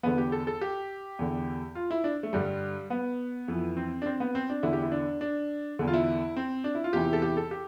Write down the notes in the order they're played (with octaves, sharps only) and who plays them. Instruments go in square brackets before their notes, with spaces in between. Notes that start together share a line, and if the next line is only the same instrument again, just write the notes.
[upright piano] E2 D3 B3
G4
A4
A4
G4
E2 D3
F4
E4
D4
A3
G2 D3 G3
B3
F2 E3
C4
D4
C4
B3
C4
D4
E2 D3 E4
G4
E4
D4
D4
E2 D3
F4
E4
C4
D4
E4
F4
E2 C3 E3 G4
A4
G4
A4
G4